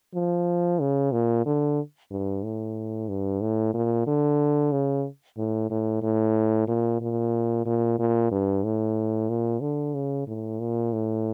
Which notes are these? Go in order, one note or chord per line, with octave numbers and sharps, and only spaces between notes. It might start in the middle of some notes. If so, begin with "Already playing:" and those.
F3
C#3
A#2
D3
G2
A2
G2
A2
A#2
D3
C#3
A2
A2
A2
A#2
A#2
A#2
A#2
G2
A2
A#2
D3
C#3
A2
A#2
A2